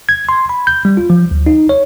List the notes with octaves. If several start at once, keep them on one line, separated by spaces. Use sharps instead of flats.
G#6
C6
B5
G6
G3
F4
F3
D2
D#4
C#5